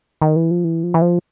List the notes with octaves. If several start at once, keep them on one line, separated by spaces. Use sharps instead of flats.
D#3
E3
F3
E3
F3
E3
F3